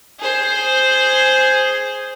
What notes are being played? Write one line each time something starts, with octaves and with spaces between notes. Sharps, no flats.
G#4 C5